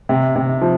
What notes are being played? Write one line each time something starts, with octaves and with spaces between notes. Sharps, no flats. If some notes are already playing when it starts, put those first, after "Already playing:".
C3
C3
F3